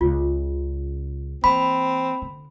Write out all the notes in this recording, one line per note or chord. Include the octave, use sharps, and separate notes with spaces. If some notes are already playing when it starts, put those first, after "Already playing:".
C#2 C#3 F4
E3 A#3 C4 B5
D3